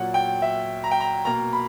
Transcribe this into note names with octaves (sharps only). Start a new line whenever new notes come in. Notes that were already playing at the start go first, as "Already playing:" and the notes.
Already playing: A#2 F#3 A#3 F#5
G5
E5
A#5
G5
A#5
B2 A#3 A#5
B5